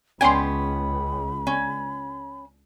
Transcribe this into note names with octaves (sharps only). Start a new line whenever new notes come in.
C#2 B3 C#4 G5 G#5 B5 C6
C#4